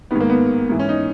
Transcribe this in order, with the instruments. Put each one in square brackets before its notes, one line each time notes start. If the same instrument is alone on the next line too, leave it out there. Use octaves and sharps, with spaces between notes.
[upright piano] G#2 D#3 B3
A#3
B3
G#2 E3
C#4
D#4